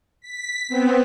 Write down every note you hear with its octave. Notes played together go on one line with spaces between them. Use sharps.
B6
B3 C4